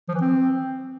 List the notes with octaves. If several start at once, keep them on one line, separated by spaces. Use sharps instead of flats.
F3
E3
C4